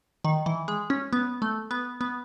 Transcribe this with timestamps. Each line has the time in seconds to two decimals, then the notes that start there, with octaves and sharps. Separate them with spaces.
0.25 D#3
0.46 E3
0.68 G#3
0.90 C#4
1.13 B3
1.42 A3
1.71 B3
2.01 B3